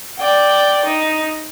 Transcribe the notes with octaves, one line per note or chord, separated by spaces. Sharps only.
D5 G5
D#4